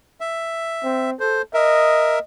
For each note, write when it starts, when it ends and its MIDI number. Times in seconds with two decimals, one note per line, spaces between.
0.21 1.10 76
0.84 1.14 60
1.20 1.41 69
1.20 1.42 72
1.54 2.19 70
1.54 2.21 75
1.54 2.19 76